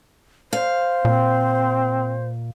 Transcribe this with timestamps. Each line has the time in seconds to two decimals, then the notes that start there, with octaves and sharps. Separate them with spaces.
0.53 C5 F5
1.05 A#2 C4